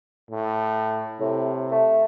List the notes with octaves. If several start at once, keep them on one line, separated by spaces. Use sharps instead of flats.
A2
A2 C3
A3